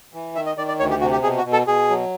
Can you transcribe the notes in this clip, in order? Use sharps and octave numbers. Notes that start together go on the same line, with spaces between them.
E3
D#3 E5
D#5
D#3 D5
D5
D2 C#5
G4
C3 F#4
G4
B2 G#4
F#4
B2
A4
B2 G#4
F#3